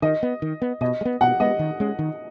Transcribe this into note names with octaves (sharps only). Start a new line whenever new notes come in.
D#3 D#5
B3
D#3
B3
B2 D#5
G#3
B3
B2 F#5
G#3 B3 D#5
D#3
G#3 C#4
D#3